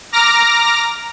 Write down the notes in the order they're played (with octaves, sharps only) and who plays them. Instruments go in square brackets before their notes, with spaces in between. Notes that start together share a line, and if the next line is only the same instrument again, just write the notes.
[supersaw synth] A#5 D6 F6 A#6